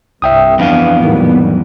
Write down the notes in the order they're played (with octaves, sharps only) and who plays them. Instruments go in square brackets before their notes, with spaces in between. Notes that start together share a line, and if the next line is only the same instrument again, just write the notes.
[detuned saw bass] C2 [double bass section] G2 [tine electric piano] E5 G5 D#6
[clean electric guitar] F2 E3 [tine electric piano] F3 D4 F5 [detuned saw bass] B3
[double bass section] A#1 F#3 G3 [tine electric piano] A2 D#3